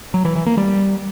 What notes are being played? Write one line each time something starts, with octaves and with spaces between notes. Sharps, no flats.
F#3
E3
E3
A#3
G3